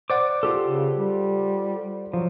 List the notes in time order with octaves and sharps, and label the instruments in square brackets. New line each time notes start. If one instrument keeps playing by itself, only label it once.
[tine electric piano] C5 D5 F#5 [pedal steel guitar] D6
[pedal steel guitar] F4 G4 A4
[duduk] C#3
G3
[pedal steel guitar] F3 [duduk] F#3